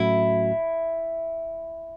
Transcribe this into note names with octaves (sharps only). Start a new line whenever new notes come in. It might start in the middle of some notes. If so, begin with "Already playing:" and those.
Already playing: A2 F#3 A3 C#4 E4 F#4